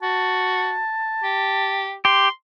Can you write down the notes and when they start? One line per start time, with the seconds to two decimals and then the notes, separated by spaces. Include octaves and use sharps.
0.02 F#4 A5
1.23 G4
2.05 G4 C6